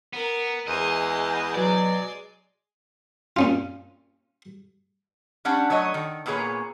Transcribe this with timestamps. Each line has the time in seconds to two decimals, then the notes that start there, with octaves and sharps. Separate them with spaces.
0.13 B3 A#4
0.67 E2 G#3 D#5 C6
1.55 B2 F#3 D5
3.36 A#2 C#4 F4
5.45 G3 C#4 D4 F#5
5.70 F#3 A3 C#5 D#5
5.94 D#3
6.26 A#2 A#3 B3 G#4 C#5